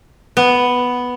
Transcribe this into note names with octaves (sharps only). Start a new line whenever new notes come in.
B3